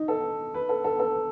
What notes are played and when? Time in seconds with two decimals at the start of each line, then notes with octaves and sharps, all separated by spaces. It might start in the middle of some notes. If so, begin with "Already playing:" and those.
Already playing: D#4
0.08 A4
0.54 B4
0.69 A4
0.84 A4
0.99 A4